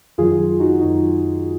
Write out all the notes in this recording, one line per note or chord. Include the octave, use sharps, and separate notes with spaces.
F#2 D#3 F#3 F4 G#4
D#4 F#4
F#2 D#3 F#3 D#4